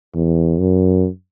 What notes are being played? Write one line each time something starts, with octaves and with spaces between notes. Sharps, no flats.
E2
F#2